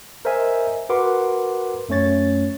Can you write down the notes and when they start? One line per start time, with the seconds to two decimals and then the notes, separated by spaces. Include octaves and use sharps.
0.25 A#4 C5 D#5 E5 G#5
0.89 F#4 A#4 B4 F#5 C6 D6
1.89 F#2 A3 C#4 C#5 A6